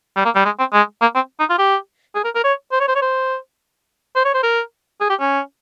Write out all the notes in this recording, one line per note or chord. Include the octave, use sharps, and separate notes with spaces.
G3
A#3
G3
G#3
C4
G#3
A#3
C4
D#4
F4
G4
G#4
A#4
A#4
C#5
C5
C#5
C5
C#5
C5
C5
C#5
C5
A#4
G#4
G4
C#4